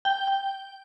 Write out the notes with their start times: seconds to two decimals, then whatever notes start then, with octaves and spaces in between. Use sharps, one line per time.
0.05 G5
0.27 G5